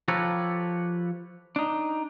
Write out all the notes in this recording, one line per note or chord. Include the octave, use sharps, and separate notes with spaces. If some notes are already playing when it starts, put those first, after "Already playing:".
F3 G4 A4 B4 C#5 A#5
D4 D#4